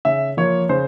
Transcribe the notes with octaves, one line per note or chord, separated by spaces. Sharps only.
C#3 E5
F3 A#3 C#5
C#3 C5